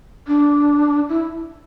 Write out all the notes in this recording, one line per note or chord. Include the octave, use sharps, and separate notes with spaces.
D4
E4